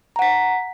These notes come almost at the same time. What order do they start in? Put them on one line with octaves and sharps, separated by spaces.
A#5 F#5 B6